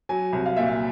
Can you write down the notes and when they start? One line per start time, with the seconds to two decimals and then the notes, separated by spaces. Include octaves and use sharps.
0.09 F#3 G#5
0.33 C2
0.45 F5
0.56 A#2 E5
0.68 F5